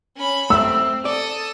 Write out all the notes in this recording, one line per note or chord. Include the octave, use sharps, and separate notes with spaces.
C#4 B5
A3 C4 E5 E6
A4 D5 D#6